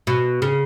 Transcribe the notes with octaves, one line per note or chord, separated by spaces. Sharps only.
B2
C#3